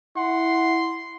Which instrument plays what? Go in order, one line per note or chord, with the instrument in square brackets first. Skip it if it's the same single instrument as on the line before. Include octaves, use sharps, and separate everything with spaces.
[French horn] E4 [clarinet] F#5 [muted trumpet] C6